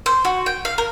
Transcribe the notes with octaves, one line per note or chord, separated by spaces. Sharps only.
C5
F#4
G5
F5
A#4